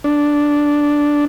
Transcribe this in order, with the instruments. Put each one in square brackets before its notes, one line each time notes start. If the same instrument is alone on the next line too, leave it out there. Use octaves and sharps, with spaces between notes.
[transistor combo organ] D4